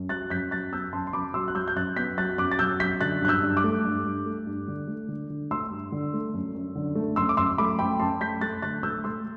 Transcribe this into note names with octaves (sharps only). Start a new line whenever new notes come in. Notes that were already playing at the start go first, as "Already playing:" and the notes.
Already playing: F#2
F#3 F#6 A6
F#2 G6 B6
F#3 F#6 A6
B3 E6 G6
F#2 A5 C6
C6
F#2 B5 D6
F#3 C6 E6
F#6
F#3 E6 G6
G6
F#2 F#6 A6
B3 G6 B6
F#3 F#6 A6
F#2 D6 F#6
A6
F#3 E6 G6
F#2 G6 B6
D3 F#6 A6
G2 F#6
E6 G6
G2
D6 F#6
A3
G2
G2
A3
G2
D3
A3
D3
D3
A3 C6 E6
G2
D3
A3
F#2
F#2
D3
A3
F#2 C6 E6
D6
F#2 C6 E6
A3 B5 D6
F#2 G5 B5
F#2 A5 C6
A3 G6 B6
A3 F#6 A6
D3 F#6 A6
A3 E6 G6
A3 C6 E6